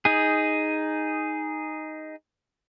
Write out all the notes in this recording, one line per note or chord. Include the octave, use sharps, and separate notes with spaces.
D#4 G#4